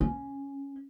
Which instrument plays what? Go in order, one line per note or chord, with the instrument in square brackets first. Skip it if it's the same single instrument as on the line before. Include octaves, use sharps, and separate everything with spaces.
[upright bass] C#4